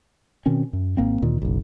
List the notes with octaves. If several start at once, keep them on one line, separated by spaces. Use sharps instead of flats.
B2 D#3 C4 C#4
F#2
G#1 A#3 C4
D2 A#2 D#3
F#1 B1